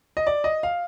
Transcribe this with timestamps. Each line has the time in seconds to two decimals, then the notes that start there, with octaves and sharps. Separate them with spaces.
0.17 D#5
0.27 D5
0.44 D#5
0.63 F5